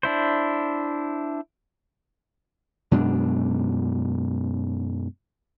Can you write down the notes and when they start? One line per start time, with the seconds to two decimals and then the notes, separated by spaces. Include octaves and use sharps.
0.03 D4 E4 C5
2.91 F#2 B2 G#3 D4